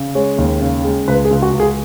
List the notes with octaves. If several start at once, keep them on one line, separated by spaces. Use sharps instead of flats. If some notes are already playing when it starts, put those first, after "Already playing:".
Already playing: C#3
G#3 C#5
D#2
C#3
G#3
C#2 B4
G#4
C#2
F#4
C#2
G#4